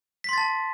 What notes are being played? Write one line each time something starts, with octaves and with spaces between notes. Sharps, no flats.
A5 C6 A6 B6